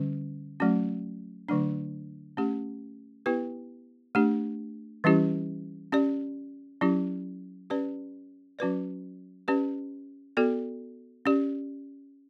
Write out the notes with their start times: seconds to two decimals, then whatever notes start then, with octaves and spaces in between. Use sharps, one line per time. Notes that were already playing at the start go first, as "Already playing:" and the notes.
Already playing: D3 G3 C#4
0.60 F#3 A3 C#4 F#4
1.49 D3 F#3 A3 D4
2.37 A3 C#4 G4
3.26 B3 E4 G4 B4
4.15 A3 D4 G4
5.04 E3 G3 C#4 E4 G4
5.92 C#4 G4 D5
6.81 F#3 C#4 E4 G4
7.70 C#4 G4 B4 D5
8.59 F#3 C#4 F#4 B4 D5
9.48 C#4 G4 B4 D5
10.37 B3 F#4 A4 D5
11.26 C#4 G4 D5